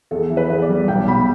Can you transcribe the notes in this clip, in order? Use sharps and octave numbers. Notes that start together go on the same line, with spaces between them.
E2 A4
E3
B4
E2
D5
G3
B1 G5
B2 B5